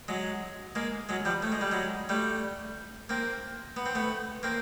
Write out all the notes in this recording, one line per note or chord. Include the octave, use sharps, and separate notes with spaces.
F#3 G#3
G#3 A#3
F#3 G#3
F3 G3
A3
G#3
G3
F#3 G#3
G3 A3
A#3 C4
B3
C4
A3 B3
A#3 C4